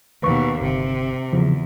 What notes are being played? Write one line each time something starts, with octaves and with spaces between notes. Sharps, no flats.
D#2 B2 B4 C#6
G1 C3
E2 C#3 F3